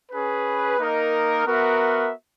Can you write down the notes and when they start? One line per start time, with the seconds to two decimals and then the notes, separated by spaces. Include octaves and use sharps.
0.12 C#4 G#4 B4
0.78 A#3 D#4 A#4 D#5
1.45 B3 F#4 A#4 E5